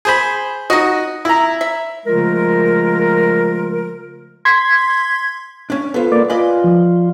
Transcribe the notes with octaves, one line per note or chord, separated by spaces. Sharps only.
G#4 C5 B5
D#4 F#4 D#5
E4 A#5
E5
C#3 F3 G#3 A3 F4 A#4
C6 G#6 B6
C#4 D4
B3 F4 A4 B4 C5
A#3 D5
F4 B4 D5 D#5 G#5
F3